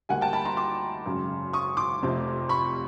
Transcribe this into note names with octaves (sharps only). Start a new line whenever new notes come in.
D2 D3 G3 A#3 F#5 G#5
G5 A5
A5 B5
A#5 C6
C6 D6
G#1 F#2 C#3 F#3
C#6 D#6
C6 D6
F1 F2 C3 F3 A3
B5 C#6